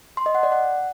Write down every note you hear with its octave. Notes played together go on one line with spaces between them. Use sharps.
C6
D#5
F#5
D5
F#5